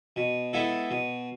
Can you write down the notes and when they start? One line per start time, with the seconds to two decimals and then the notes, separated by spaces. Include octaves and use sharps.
0.16 B2
0.53 G#3 B3 E4 A4
0.91 B2